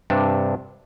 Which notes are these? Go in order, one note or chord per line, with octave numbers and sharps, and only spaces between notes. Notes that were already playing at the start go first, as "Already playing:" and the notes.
G2 C3 D4